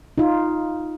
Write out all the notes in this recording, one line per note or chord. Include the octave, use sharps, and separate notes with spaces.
D#4 F4